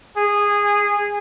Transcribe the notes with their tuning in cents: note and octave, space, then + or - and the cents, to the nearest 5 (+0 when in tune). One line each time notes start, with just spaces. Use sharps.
G#4 -15